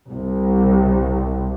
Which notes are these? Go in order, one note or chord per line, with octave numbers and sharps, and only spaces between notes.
C2